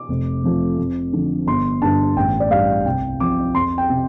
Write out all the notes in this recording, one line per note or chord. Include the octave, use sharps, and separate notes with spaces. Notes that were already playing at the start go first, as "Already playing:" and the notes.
Already playing: D6
F1
F2 C3 F3 A3
F2
D3 F3
G1 C6
G2 D3 A5
A1 G5
D5
G2 G3 F5
C2 G5
C3 F3 D6
F2 C6
G5
C3